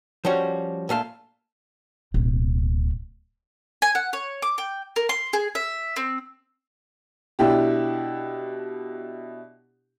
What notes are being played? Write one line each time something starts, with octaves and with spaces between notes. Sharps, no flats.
F3 G3 C#4 F#4
A#2 A3 F5 A5
D1 B2
G#5
F#5
C#5
D6
G5
A#4
C6
G#4
E5
C4
B2 D4 E4 G4